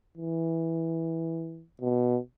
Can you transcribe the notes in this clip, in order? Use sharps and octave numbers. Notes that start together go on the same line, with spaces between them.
E3
B2